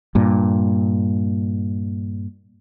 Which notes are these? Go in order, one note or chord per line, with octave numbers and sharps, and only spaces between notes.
G2 A#2